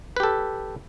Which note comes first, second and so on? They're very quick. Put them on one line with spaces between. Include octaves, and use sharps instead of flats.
B4 G4 A4